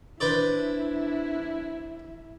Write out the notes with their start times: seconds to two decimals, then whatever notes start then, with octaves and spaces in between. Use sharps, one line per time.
0.20 D4 E4 B4 C5 D5